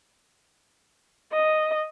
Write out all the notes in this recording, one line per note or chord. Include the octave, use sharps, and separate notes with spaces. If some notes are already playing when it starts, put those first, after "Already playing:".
D#5